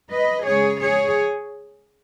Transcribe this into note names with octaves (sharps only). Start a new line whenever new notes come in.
B4 D#5
C#3 G#3 G#4 C#5
G#4 C#5